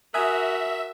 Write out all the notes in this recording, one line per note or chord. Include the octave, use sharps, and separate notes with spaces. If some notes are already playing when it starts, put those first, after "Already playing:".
F#4 A#4 E5 G#5 D#6 F#6